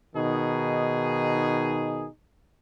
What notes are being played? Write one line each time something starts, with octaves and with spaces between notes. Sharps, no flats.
B2 D#3 D#4 G#4